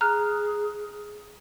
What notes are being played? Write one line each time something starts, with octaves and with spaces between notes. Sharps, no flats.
G#4 A#5 F6 F#6